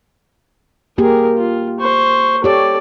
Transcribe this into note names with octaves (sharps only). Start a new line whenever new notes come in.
A#3 G4 G#4 A#4
F4
C5 C#6
G4 A4 C#5 D5